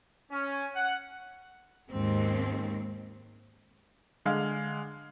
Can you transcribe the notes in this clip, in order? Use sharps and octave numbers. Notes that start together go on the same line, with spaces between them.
C#4
F#5
D#2 G#2 C4
D3 G#3 F5 F6